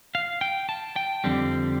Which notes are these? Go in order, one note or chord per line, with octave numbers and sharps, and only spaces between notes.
F5
G5
A5
G5
F2 D3 G3 C4